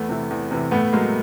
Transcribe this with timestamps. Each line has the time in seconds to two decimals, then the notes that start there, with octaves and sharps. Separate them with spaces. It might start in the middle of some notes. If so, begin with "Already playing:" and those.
Already playing: E2 A3 B3
0.09 C3 E3
0.30 E2
0.51 C3 E3
0.71 A2 A3 B3
0.93 F#3 G#3 A#3